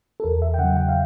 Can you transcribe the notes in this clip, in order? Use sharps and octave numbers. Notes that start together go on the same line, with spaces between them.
A4
E2 A#4
E5
G5
C#3 F#5
F#3
G5
F5